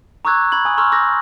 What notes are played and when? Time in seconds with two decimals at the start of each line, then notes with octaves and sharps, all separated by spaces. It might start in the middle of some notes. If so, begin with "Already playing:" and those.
0.25 A#5 C#6 D6 E6 F#6 G#6
0.52 B5 G#6 F#7
0.65 G#5 D#6
0.77 A#5 C6 C#6 E6 F6
0.92 D6 E6 G6 A#6